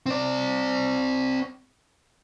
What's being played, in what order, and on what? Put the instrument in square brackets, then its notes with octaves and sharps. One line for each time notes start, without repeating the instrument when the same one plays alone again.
[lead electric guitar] C4 D5